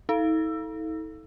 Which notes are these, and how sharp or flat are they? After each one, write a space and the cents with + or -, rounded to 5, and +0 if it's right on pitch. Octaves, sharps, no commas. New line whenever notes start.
D#4 +45 A4 +0